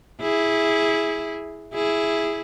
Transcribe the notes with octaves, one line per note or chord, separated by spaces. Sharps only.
E4 G#4
E4 G#4